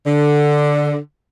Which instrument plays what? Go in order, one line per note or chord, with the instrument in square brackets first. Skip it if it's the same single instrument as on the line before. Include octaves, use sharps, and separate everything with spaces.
[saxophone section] D3